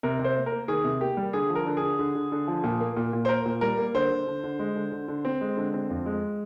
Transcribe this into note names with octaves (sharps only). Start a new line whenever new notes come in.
C3 A#4
C3
C5
A#3
A#4
A#3
D#3 G#4
C3
A#3 G4
G3
D3 G#4
F3
A#4
D3
G#4
D3
D3
D3
D3
F3
A#2
A#3
A#2
A#2
C5
A#3 A#4
A#2
G3 A#4
A#3
D3 C5
D3
D3
D3
G#3
D3
D3
D3
C4
G#3
D3
C4
F2
G#3